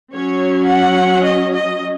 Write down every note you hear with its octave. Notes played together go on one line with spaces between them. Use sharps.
F#3 C#4 C#5
F#5
D#5
D#5